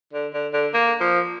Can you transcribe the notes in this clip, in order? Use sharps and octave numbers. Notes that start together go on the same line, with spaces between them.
D3
D3
D3
A#3
F3